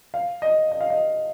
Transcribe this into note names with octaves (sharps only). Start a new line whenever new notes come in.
F5
D#5
D#5
F5
D#5